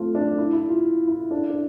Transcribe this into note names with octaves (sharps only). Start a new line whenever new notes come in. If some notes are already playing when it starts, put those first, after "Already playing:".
Already playing: A3 C4 F4
D4
E4
E4
F4
E4
D4
D4